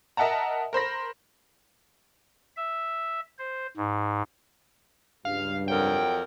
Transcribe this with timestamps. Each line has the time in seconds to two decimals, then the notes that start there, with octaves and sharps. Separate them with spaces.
0.17 A#4 D#5 E5 F#5 A5 A#5
0.73 A#4 C5 B5 A#6
2.57 E5
3.39 C5
3.77 G#2
5.25 C#2 G2 F5
5.68 F2 F#3 A#4 G5